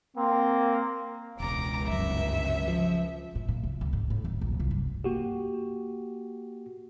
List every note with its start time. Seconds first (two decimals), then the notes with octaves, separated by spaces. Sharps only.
0.17 A#3 C4
1.40 E1 C#2 A#5 D6
1.89 G1 F#2 E5
2.68 F3
3.35 A2
3.48 A#2
3.63 C2
3.81 D2
3.93 G#2
4.10 A2
4.25 D#2
4.41 A#1
4.60 C2
4.71 G2
5.04 A#3 F#4 G4